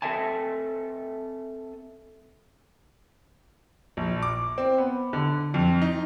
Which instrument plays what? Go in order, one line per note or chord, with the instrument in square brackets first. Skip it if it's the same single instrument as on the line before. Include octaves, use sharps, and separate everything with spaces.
[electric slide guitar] C4 A4 D#5 E5 G#5 A5
[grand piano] A#1
D6
C4
B3
D3
F2
D#4